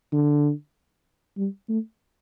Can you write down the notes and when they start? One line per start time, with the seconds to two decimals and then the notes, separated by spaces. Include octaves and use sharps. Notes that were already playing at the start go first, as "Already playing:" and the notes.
0.13 D3
1.37 G3
1.69 A3